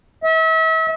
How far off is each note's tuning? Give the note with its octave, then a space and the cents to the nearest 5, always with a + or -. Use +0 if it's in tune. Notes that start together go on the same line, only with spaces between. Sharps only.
E5 -35